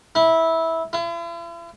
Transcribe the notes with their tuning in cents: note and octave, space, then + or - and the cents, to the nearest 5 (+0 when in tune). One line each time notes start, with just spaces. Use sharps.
E4 -15
E4 +45